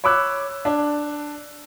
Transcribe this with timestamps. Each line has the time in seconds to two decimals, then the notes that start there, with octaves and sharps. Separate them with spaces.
0.04 C#5 B5 D6 E6 F#6
0.65 D4